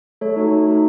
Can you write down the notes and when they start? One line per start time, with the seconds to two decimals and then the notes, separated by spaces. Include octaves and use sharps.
0.21 A3 A4 C#5
0.36 D#4 F#4 A4
0.52 A3
0.67 D#4 F#4 A4